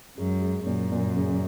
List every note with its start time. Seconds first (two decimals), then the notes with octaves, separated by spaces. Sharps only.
0.18 F#2 G#3
0.42 G#3
0.67 F#2 A#2
0.92 A#2
1.17 C#3